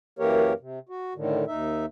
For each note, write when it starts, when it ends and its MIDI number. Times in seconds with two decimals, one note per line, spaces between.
0.19 0.53 42
0.19 0.53 52
0.19 0.53 58
0.19 0.53 67
0.19 0.53 70
0.19 0.53 73
0.60 0.79 48
0.89 1.13 66
1.15 1.44 45
1.15 1.44 50
1.15 1.44 51
1.47 1.86 39
1.47 1.86 63
1.47 1.86 76